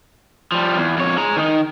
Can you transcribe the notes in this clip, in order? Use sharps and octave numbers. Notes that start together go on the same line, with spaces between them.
F3 G3
E2
F2 C#5
G#4 A#5
D#3 D#4